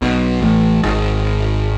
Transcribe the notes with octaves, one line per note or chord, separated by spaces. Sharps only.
B1 B2
A1 A2
G#1 G#2